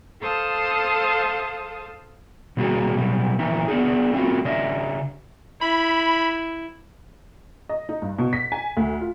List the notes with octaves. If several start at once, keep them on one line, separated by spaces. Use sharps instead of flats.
A4 C5 F5 A5 D#6
B2 G3 A#3 F4 F#4 G#4
B2 F#3 G3
A#2 D#3 E3 D#4 E4
B3 D4 D#4 G#4
A3 C4 F4 F#4
C#3 D4 D#5 E5
E4 B5
D#5
D#4
G2
B2
B6
G#5
D2
F4